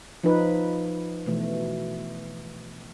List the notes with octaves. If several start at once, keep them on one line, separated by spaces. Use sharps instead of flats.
F3 D#4 B4
B2 E3 A3